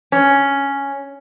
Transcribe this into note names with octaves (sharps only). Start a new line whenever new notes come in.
C#4